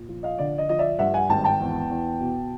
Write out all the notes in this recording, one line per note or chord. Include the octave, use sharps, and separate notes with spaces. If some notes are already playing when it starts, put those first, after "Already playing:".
Already playing: A#2
F3
D#5 F5
D3 D5
D#5
F3 D#5
D5 E5
G2 E5 F#5
F#5 G#5
G#1 G5 A5
G5 A5
E2
E2
B2